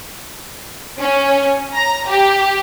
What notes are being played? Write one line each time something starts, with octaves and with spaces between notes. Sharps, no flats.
C#4
A#5
G4